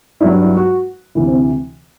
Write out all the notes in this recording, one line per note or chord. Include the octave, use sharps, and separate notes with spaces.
G2 F#3 E4
D4
E4
F#4
D2 C3 E3 E4
C4